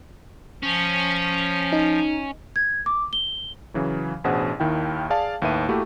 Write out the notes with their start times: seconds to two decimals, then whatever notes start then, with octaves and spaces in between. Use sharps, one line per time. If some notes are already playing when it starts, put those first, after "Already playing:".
0.63 F3 C#4
1.72 D#4
2.56 G#6
2.86 D6
3.13 G7
3.74 C#3 E3 F#3
4.24 A1 B2 D4 G#4 C5 F#5
4.60 D#2 D#3 E4 G5
5.10 G#4 D5 F5 A5
5.42 D#2 A2 D#3 B4 E5 D#7
5.69 A3 A#3 E4 F#4 G4